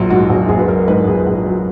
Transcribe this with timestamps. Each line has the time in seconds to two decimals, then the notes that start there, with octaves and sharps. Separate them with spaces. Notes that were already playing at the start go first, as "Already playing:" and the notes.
Already playing: A#1 F#3 F4
0.10 G#2 F#4
0.29 A#1
0.49 A#1 G#4
0.59 B4
0.68 F#3 A#4
0.88 G#2 B4
1.07 A#1 G#4
1.26 A#1
1.46 F#3